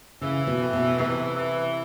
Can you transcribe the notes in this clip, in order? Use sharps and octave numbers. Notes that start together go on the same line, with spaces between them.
C#3 E3
B2
A2
B2
C3 E3
E3